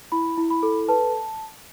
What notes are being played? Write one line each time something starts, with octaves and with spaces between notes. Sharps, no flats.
E4 B5
E4
B5
A4
B4 A5